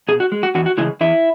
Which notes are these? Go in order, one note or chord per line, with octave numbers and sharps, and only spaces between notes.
B2 G#4
F#4
G#3
F#4
E2 F#4
F#4
C#3 E3 G#3 E4
E2 E4